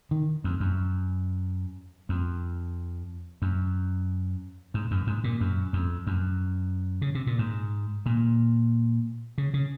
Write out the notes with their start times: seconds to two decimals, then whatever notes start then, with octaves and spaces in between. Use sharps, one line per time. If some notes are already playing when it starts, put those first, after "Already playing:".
0.11 D#3
0.44 F2
0.60 F#2
2.09 F2
3.42 F#2
4.74 G#2
4.91 F#2
5.07 G#2
5.24 A#2
5.41 F#2
5.73 F2
6.07 F#2
7.02 C#3
7.15 C3
7.27 A#2
7.39 G#2
8.06 A#2
9.38 C#3
9.54 C#3